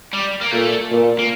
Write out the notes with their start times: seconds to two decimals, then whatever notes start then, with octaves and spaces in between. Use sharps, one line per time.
0.13 G3
0.41 A#3
0.51 A#2 A3
0.91 A#2
1.19 A#3